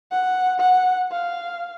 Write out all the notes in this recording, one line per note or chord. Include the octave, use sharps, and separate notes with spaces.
F#5
F#5
F5